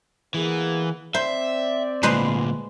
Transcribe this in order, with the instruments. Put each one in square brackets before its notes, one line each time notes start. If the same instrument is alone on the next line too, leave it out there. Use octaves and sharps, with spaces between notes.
[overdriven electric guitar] E3 [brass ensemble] A#3 B3 G#4
[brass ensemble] C4 D5 [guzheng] C5 [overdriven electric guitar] E5
[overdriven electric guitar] D2 A#2 [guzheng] G#3 B4 C5